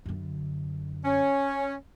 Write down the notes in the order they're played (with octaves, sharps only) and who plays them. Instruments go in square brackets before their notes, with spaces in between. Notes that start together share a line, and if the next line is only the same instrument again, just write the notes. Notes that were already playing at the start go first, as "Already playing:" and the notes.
[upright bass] F#2 D3
[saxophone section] C#4